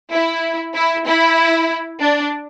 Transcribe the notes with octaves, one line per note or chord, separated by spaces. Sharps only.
E4
E4
E4
D4